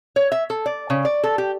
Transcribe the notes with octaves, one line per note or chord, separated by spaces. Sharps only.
C#5
E5
A4
D5
C#3
D5
A4
G4